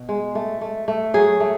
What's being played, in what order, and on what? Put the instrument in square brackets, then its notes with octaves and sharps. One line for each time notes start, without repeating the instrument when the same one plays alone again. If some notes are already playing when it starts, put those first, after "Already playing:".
Already playing: [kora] B2
G#3
A3
A3
A3
F#3 G#4
A3